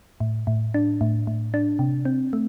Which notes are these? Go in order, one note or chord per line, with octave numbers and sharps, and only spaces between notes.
A2
A2
D4
A2
A2
D4
C3
C4
A3